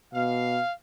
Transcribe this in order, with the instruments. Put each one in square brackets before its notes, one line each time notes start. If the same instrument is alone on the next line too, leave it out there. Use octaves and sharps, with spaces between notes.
[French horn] B2 [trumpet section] F5